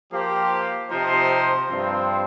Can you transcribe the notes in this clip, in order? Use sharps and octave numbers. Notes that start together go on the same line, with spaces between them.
F3 A#3 G4 C5
C3 F3 D#4 C5
G2 F3 C4